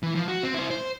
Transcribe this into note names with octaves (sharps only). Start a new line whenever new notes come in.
E3
F3
F#4
C4
E4 C5
C5